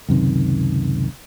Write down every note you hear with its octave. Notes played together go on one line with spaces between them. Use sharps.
C#2 F#2 C3 D#3